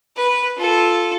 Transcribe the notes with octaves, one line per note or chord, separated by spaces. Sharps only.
B4
F4 A4